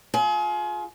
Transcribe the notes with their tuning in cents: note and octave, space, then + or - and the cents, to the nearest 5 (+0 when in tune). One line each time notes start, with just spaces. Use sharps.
F4 +15 G#4 +35